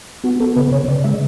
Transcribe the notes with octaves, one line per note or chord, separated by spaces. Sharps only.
B3 F#4
B3 A4
C#3 B4
C#3 C#5
C#3 D5
G#3 E5